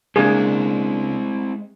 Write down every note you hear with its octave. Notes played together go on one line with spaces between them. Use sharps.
C#2 G#3 A#3 C4 D4 E4 G#4